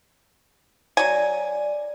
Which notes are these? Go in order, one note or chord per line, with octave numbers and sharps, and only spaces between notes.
F#3 D5 G#5